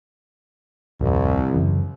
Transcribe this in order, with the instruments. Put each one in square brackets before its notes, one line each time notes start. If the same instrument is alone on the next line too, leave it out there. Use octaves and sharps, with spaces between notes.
[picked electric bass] D1 F2 [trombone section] C2
[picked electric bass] F#2 C#3 E3